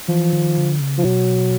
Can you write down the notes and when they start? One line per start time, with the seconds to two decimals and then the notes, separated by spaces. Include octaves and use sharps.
0.08 E3 F3
0.33 D#3
0.57 D3
0.80 C#3
0.98 F3
1.04 B2 F#3